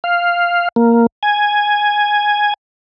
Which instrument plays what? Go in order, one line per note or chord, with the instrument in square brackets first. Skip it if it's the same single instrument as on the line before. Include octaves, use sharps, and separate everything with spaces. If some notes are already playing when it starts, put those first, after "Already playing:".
[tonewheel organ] F5
A#3
G#5